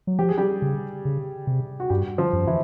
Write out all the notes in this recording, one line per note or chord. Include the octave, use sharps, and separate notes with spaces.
F#3
F3 G4
G#4
G3 G4
C#3
C#3
C3
F#4
G2 G3 G4
F3 F4
F#2
E3 E4